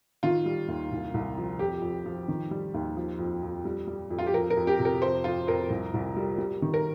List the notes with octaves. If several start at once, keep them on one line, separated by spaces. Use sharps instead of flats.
D#3 F4
G3
D#2
C2
C2
F3
F2 G4
F2
F3
D#3
G3
D#2
F3
F2
F2
G3
G3
F2
F4
G4
F3 A#4
A#4
F2
G4
C3
A#4
F2 C5
F2 F4
F2 A#4
C2
C2
G3
G3
D#3
A#4